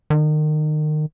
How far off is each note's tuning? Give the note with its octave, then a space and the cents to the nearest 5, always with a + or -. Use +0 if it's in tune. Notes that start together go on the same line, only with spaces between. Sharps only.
D#3 -30